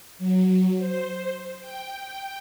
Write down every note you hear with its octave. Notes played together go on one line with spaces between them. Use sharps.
F#3
C5
G5